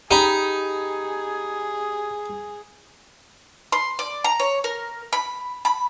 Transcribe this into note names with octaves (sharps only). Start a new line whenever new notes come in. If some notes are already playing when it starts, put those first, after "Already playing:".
D#4 G4 G#4 B5
C6
D5
A#5
C#5
A#4
B5
B5